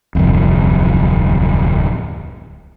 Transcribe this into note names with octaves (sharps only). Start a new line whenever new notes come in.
D1 C2 F2